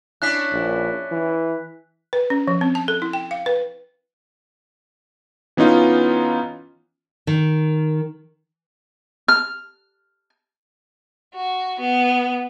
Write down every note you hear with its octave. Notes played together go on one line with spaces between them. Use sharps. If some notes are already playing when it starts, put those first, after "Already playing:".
C#4 D4 E4 F#6 B6
A#1
E3
B4
C#4
F3
C4
A5
A4
E4
G5
F5
B4
E3 B3 C#4 D#4 F4
D#3
F6
F#4
B3